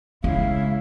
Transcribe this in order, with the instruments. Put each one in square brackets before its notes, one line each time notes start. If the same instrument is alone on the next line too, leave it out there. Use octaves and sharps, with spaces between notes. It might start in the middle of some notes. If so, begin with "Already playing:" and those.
[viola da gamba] C#3 E4 [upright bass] G#3 [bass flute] F5